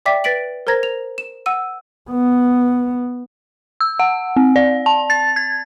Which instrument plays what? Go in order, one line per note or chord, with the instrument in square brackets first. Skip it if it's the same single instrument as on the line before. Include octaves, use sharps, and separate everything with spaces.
[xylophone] D5 E5 G5 D6 B6
B4 A6 B6 D7 F#7
A#4 C5 A#5 G#6 A#6
F7
E7
F#5 E6 D#7
[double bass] B3
[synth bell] E6
F#5
C4
D5
A5
A6
G#6